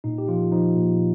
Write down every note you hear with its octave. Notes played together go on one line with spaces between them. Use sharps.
A#2 D#4
G4
F3 F4
F3 D#4
A#2